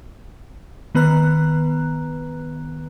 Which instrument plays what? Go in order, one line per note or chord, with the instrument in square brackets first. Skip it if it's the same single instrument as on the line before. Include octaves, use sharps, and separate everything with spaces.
[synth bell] D#3 B3 B4 A#5 F#6